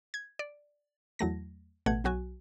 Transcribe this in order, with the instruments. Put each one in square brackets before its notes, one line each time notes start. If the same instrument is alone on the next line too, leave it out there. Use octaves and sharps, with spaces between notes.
[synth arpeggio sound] G#6
D5
E2 F#3 A3 A#6
A1 B2 A3 F#5 G#6
B1 F#3 F#4 G#5